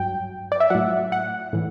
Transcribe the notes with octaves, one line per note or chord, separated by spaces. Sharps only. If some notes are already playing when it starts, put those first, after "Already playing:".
Already playing: G2 F#3 G5
D5
E5
A2 F#3 F#5
F#5
A2 E3